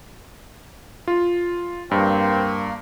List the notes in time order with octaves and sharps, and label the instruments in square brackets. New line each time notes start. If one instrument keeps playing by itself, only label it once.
[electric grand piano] F4
[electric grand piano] G2 [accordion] A#3 [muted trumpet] C4